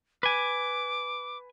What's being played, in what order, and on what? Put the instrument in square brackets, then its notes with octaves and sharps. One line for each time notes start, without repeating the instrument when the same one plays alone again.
[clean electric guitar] B4 G#5 [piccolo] D6